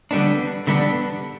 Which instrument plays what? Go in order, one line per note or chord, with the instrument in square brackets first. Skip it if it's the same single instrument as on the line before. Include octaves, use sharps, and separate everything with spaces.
[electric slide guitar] D3 G3 B3 D4
D3 G3 B3 D4